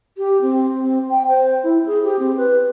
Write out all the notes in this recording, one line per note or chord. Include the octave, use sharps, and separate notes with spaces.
G4
C4
C4
G5
C5
E4
G#4
G4
C4
B4